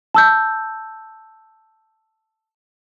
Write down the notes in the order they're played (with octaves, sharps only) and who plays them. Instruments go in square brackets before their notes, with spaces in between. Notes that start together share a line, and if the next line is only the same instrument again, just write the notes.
[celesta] A5 E6 G6